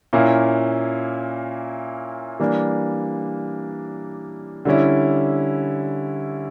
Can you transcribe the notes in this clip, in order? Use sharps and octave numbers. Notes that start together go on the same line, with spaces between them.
A#2 A#3 C#4 E4
E3 G3 A#3 D4
D3 G3 C#4 E4